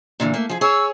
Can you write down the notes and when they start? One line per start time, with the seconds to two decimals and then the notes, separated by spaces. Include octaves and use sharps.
0.20 A#2 D3 E3
0.34 A3 A#3
0.49 F3 G#4 G#5
0.61 G#4 C#5 C#6 E6